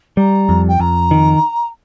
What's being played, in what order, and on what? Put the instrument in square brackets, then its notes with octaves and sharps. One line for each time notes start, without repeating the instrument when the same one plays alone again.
[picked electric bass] G3 [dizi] A#5
[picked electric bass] F2
[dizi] G5
[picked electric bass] F2 [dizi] A#5
[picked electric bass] D#3